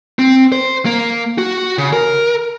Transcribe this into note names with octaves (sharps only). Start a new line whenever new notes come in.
C4
C5
A#3
F#4
C#3
A#4